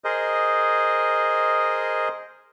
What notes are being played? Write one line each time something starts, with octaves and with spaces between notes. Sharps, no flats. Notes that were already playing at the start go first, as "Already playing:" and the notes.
G#4 A#4 C5 D#5